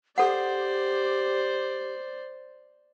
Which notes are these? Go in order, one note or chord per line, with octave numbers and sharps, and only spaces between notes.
G4 A4 C5 D5 F#5